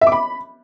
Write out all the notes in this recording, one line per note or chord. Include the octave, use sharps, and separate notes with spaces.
E5
D6
B5